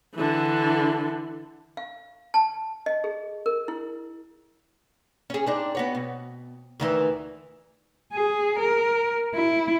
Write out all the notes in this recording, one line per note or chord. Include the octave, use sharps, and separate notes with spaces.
D3 E3
F5
A5
D#5
G#4
A#4
E4
C#4 G#4
C4 D4 D#4
B3 F#4 C#5
B2
D2 D#3 E3
G#4
A#4
E4